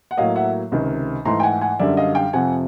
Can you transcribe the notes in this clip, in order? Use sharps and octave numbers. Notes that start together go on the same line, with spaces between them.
F#5
A2 F#3 A#3 D#5 F5
E5 F#5
C#2 C3 D#3
G#2 E3 A3 A#5 C6
G5
F#5 G#5
F#5 G#5
F#2 D3 G3 D5 E5
D#5 F5
F5 G5
F2 C3 F3 F#5 G#5